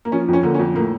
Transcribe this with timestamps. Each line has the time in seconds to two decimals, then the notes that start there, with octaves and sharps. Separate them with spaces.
0.05 A#3
0.12 F3 C#4
0.28 F2
0.33 C#4
0.43 D3 A#3
0.54 C#4
0.59 F2
0.75 A2 A#3